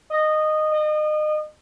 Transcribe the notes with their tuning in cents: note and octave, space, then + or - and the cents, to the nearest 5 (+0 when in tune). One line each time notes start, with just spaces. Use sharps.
D#5 -15
D#5 -30